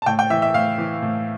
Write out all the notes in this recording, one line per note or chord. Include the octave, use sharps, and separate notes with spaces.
A5
A2 G5
G5
E3 E5
E5
A2 F5
E3
A2